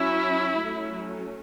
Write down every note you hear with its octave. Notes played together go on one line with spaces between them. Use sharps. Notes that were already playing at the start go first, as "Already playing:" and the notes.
Already playing: F#3 C#4 E4
F#3 A3 C#4